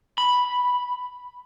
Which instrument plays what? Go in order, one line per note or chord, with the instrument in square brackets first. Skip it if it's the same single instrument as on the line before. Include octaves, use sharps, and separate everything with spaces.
[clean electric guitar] B5